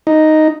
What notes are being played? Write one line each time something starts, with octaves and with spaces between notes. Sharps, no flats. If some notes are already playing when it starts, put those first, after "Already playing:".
D#4